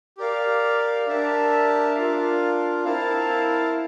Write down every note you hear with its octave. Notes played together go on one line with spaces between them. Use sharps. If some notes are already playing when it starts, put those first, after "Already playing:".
G4 A#4 D5 F5
D4 G4 A#4 E5 A5
D4 F4 A#4 F5
C4 E4 A#4 F5 A5